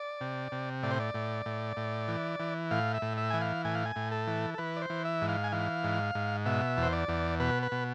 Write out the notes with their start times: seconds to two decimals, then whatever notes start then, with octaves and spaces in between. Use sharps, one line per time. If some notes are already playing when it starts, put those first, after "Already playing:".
Already playing: D5
0.21 C3
0.52 C3
0.83 A2 D5
0.91 C5
1.00 D5
1.14 A2
1.46 A2
1.77 A2
2.08 E3
2.40 E3
2.71 A2 F5
2.94 E5
3.02 A2
3.17 E5
3.30 E3 G#5
3.41 F5
3.65 A2 G#5
3.75 F5
3.85 G#5
3.96 A2
4.12 A4
4.27 E3
4.54 A4
4.58 E3 B4
4.77 D5
4.82 C5
4.90 E3
5.05 E5
5.21 G#2
5.29 F5
5.44 G#5
5.52 E3 F5
5.84 G#2
6.15 G#2
6.46 B2 E5
6.77 E2
6.83 C5
6.93 D5
7.08 E2
7.40 B2 B4
7.63 B4
7.72 B2